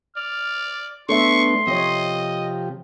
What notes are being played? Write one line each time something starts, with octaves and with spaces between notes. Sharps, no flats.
D5 F6
A3 B3 D4 A4 C#5 E5 C6 C#6
C3 F3 C4 G4 C#5 D#5